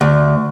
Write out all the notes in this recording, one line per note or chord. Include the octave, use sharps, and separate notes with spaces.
D2